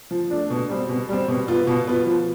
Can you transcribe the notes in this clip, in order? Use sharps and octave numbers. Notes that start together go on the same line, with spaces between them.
F3
A3 D4
B2
G3 C4
B2
G3 C4
B2
B3 F4
B2
B3 F4
F3